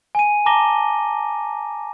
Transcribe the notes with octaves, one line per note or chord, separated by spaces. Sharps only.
G#5 D#7
A5 A#5 D6 A#6 G7